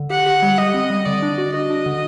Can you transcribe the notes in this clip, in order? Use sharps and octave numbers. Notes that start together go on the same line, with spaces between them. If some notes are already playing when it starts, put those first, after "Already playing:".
Already playing: D3
G4 F#5
G4
G3
G4 D#5
C4
G3
D3 D5
D4
F#4
F#4 D#5
D4
D3